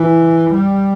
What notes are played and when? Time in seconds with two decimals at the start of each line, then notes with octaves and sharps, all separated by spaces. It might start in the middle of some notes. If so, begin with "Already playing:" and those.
Already playing: E3
0.54 G3